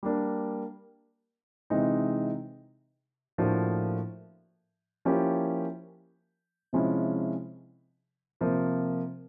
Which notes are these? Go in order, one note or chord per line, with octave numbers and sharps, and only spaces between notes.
G3 A#3 D4
C3 E3 G#3 C4 D#4
A2 F3 A#3 D4 F#4
F3 A#3 C#4 E4 G4
C3 F3 G#3 C#4 E4
C3 F3 A#3